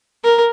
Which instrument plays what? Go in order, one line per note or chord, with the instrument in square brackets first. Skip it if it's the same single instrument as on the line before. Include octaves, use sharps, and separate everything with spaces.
[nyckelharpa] A#4